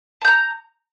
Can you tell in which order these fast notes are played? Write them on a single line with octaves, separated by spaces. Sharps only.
A5 G6 A#5